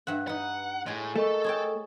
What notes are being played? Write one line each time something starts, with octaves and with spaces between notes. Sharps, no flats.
G2 E5 F#5
D#4 B4 F#5 F#6
A2 G#3 G#5
A3 A4 A#4 D#5 C#6
G#4 C#5 G5